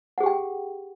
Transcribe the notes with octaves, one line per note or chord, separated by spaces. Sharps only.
G4 G#4 F#5 G5